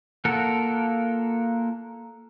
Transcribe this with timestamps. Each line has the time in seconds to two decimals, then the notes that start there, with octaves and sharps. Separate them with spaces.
0.25 A#3 F4 A4 A#4 F#5